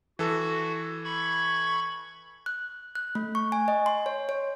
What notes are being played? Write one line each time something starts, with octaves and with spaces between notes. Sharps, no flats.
E3 F#4 A4
B5 C#6 G#6
F#6
F#6
A3
C#6
G#5
D#5
C6
C#5
C#5